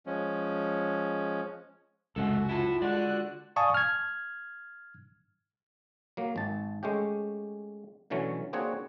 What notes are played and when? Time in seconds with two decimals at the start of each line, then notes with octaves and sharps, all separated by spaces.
0.06 F3 G#3 C#4
2.16 C#2 F#2 C3 G#3 F#4 A4
2.49 E4 F4 A5
2.82 D3 G#3 F#4 D5 F#6
3.56 D5 F5 G#5 A5 C#6 D#6
3.74 F6 G#6
6.17 F#3 A#3
6.36 G#1 A5
6.83 G#3 A3 C#4 G4
8.10 B2 D3 E3 F#3 A3 C#4
8.53 A#3 C4 D4 F#4 G#4 C#5